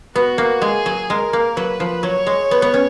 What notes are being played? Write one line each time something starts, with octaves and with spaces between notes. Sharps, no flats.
B3 F#4
A#3
G#3 G#4
F#3
G#3 A#4
A#3
F#3 B4
F3
F#3 C#5
G#3
B3
B3
C#4